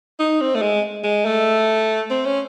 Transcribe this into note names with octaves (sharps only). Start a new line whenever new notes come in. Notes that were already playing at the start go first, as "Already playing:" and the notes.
D#4
C4
A3
G#3
G#3
A3
C4
C#4